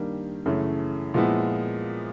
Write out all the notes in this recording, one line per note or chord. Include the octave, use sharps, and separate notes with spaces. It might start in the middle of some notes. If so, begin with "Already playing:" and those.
Already playing: D#3 G3 A#3 D4
F#2 C#3 E3 A3
A#2 F3 G#3 B3 E4